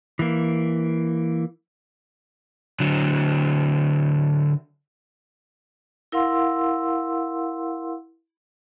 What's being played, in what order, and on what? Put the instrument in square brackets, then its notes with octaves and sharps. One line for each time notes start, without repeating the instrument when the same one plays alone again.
[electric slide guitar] E3 A#3
[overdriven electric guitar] D3 F#3
[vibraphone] E4 A#4 F5 F#5 C6 E6